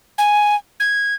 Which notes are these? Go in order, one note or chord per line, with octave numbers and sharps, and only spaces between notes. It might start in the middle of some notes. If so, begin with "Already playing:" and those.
G#5
G#6